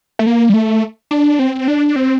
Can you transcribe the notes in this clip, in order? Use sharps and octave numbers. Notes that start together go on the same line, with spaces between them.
A3
A#3
G3
A3
D4
C4
D4
C4